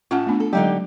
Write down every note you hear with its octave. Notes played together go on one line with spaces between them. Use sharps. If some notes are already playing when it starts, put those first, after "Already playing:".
A2 C#4 F4 F#5 A5
A3 B3 D4
A4
D3 F#3 G#3 D#4 G4